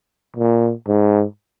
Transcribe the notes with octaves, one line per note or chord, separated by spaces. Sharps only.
A#2
G#2